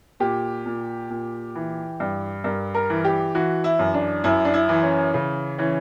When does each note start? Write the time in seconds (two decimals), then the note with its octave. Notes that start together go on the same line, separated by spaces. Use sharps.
0.20 A#2 G4
0.66 A#2
1.10 A#2
1.55 E3
2.00 G2
2.44 G2 A#4
2.75 A#4
2.90 E3
3.05 G4
3.35 E3 F#4
3.64 E4
3.79 F#2
3.94 D4
4.24 F#2 E4
4.45 D4
4.54 E4
4.69 E3
4.83 C#4
5.14 C#3
5.58 E3 C#4